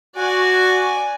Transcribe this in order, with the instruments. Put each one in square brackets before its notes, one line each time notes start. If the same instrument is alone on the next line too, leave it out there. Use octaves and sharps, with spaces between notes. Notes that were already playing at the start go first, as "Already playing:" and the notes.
[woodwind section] F#4 [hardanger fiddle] D5 G#5